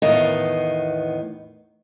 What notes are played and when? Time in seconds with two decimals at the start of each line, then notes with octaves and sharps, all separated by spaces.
0.02 E2 A2 D#3 B3 D#5 F5